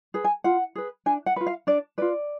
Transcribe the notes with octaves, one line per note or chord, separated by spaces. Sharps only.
G#4 B4
G#5
F4 F#5
G#4 B4
D4 G#5
F#5
F4 B4
F5
D4 D5
F4 B4 D5